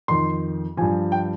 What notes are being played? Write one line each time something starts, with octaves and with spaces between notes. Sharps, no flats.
F2 D#3 C6
G2 F3 G#5
G5